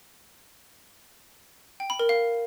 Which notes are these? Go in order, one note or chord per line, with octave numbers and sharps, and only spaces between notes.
G5
B5
A#4
F5